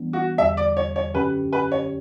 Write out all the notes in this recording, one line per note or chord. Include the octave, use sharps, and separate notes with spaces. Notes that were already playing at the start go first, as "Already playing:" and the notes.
Already playing: E3 G3 B3 D4
F#4
E2 D3 G3 E5
D5
C#5
C#5
F#2 D3 F#3 C#4 G4 B4
B4
C#5